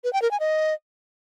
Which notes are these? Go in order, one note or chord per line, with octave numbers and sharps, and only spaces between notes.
B4
G5
A#4
G#5
D#5